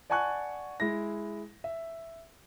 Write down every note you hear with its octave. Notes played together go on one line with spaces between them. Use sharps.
D5 F#5 G#5 A5 C#6 F#6
G#3 E4 A#6
E5